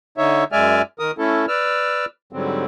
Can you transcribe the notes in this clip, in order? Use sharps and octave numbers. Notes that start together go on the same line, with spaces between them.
D3 D#4 C#5 E5
F#2 G#3 D5 E5 G#5 F6
D#3 A#4 D#6
A3 C#4 E4 A4
B4 D5 E6 F6
G#2 D3 F#3 G3 C4